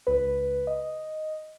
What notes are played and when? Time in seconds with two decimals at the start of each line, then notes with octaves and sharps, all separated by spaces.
0.07 C#2 B4
0.67 D#5